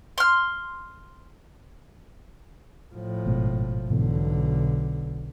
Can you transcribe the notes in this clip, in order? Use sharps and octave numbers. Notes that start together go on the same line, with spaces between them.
C6 F6
A2 F3
G#1 B2 G#3
B1 G#2 B2 D3 E3